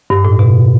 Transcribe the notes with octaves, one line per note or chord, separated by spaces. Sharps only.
G2
A2
B2